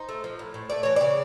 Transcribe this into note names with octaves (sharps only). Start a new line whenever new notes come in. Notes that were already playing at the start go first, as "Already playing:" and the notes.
Already playing: D#4 C5
A3
F3
A2
A2
A3 D5
E3 C#5
C#3 D5